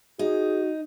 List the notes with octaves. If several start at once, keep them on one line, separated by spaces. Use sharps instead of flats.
D#4 F#4 G#4